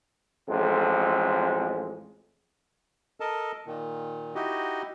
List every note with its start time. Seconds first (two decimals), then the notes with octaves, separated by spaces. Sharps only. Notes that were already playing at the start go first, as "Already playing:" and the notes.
0.47 A1 F2 G#3
3.20 A4 A#4 D#5 A5
3.66 A#2 D#3
4.35 D#4 E4 F#4 G4 D#5